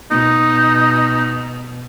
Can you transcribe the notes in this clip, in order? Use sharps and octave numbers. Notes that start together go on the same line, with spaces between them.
B2 D#4